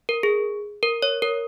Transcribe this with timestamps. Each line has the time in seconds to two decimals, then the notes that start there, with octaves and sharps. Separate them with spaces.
0.09 A#4
0.23 G#4
0.83 A#4
1.02 C#5
1.22 A#4